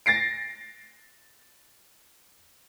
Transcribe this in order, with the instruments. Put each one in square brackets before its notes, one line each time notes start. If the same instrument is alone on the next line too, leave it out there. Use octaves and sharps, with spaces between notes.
[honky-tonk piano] A6 A#6 C7 D7